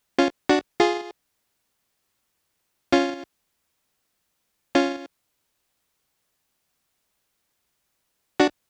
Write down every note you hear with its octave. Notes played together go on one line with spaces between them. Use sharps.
C#4 F4
D4 F#4
F4 G#4
C#4 F4
C#4 F4
D4 F#4